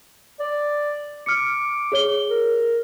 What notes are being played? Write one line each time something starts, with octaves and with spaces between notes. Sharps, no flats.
D5
D6 F6 C#7
G#4 C#5 G7
A#4